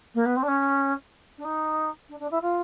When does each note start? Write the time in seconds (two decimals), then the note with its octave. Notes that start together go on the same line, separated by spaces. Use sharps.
0.15 A#3
0.26 B3
0.37 C4
0.43 D4
0.48 C#4
1.38 D4
1.45 D#4
2.09 D4
2.20 D4
2.31 E4
2.42 F4